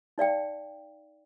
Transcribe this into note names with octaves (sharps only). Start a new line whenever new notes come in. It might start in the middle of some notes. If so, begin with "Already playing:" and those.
D#4 D5 F5 G5